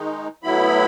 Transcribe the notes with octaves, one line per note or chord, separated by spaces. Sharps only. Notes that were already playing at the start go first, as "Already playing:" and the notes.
Already playing: D#3 G#3 D#4
A2 F#3 B3 E4 B5